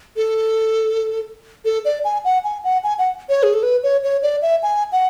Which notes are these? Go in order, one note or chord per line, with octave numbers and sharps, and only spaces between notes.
A4
A4
D5
G#5
F#5
G#5
F#5
G#5
F#5
C#5
G#4
A4
B4
C#5
C#5
D5
E5
G#5
F#5